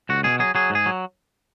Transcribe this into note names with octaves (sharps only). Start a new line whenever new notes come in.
C#2 F#4
B2 G#4
F#3 G#4
F#3 G#4
G#2
G#4
F#3